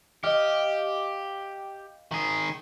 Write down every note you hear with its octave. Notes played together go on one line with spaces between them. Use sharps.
G4 D#5 F5
D#3 G#4